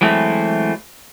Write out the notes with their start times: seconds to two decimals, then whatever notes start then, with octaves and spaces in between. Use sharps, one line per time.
0.01 E3 F#3 G#3 A3 C4